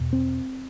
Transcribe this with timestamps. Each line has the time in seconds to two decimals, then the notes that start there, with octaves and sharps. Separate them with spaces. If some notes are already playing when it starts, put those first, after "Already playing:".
Already playing: E2 B2
0.13 C4